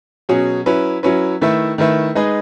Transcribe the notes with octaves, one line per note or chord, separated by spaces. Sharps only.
B2 F#3 C#4 G#4
F#3 C#4 E4 B4
F#3 C#4 E4 B4
D#3 A3 E4 B4 E5
D#3 A3 E4 B4 E5
G#3 D#4 G#4 B4 D#5